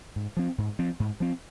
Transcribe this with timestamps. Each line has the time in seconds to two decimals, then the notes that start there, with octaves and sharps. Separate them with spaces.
0.16 G#2
0.37 F3 C4
0.58 G#2
0.79 F3 C4
1.00 G#2
1.20 F3 C4